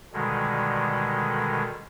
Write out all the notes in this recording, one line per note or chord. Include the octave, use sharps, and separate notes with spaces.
B2 D3 D#3 G3 G#3